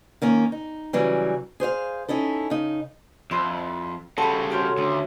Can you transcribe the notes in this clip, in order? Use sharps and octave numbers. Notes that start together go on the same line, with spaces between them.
D#3 A#3 C#4
D#4
C#3 E3 F#3 G3
G#4 C5 C#5 F5
C#4 D#4 E4 A4
C#3 D#4
F2 E4 C5 D5
C#3 G3 F#4 A4 C5 B5
C#4 F#4 G4 A#4 C5
D2 F4